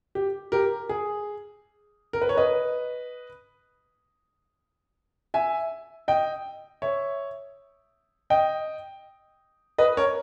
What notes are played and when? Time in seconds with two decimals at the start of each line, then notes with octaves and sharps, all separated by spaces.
0.15 G4
0.52 G4 A#4
0.89 G#4
2.13 A#4
2.22 B4
2.29 C#5
2.37 B4 D#5
5.34 E5 G#5
6.08 D#5 G5
6.82 C#5 E5
8.30 D#5 G5
9.78 B4 D#5
9.97 A#4 C#5